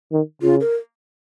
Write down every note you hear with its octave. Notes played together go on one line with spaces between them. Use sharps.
D#3
C#3 F4
A#4